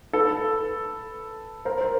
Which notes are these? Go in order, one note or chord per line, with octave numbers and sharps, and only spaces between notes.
A4 B4
A#4 C5
C5